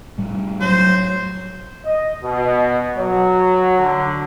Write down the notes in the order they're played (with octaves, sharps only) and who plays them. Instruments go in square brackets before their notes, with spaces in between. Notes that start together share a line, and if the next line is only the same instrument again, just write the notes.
[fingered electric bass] A2 G3 A3
[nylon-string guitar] F#3 [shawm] C5
[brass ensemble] D#5
B2
F#3
D3